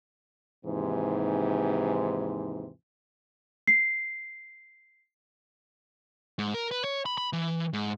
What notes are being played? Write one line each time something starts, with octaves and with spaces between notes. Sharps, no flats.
D#2 G#2 C3 E3
C7
G#2
A#4
B4
C#5
B5
B5
E3
G#2